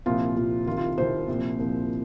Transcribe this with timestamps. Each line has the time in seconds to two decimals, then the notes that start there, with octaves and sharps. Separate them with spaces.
0.06 C2 A#2 F3 F4
0.36 C2 A#2 F3
0.67 C2 C3 D#3 F4
0.77 F4
0.98 C2 C3 D#3 C5
1.28 C2 A#2 F3
1.59 C2 A#2 F3